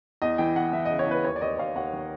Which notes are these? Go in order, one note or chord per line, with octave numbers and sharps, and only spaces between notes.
E2 D#5
E3 G5
E2 F#5
E3 E5
D#5
C#3
C#5
E2 B4
D#2 C#5
D5
D#2 D#5
D#2 F5
D#2 F#5
D#3